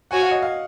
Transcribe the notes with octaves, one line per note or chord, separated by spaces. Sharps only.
F#4 C#5 F#5 G#5
F5
D#5
F5